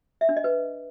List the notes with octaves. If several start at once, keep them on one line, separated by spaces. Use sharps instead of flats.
E5
D4
D#5
B4